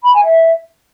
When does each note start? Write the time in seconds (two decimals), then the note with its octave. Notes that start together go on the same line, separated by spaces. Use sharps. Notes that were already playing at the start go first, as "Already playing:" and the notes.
0.03 B5
0.14 G#5
0.24 E5